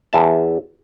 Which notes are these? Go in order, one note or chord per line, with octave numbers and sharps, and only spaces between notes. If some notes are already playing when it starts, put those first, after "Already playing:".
E2 E5 A5